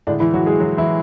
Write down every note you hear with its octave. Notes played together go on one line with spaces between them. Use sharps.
A2 D3 G#3 D4
E3 E4
F#3 F#4
G#3 G#4
F#3 F#4
E3 E4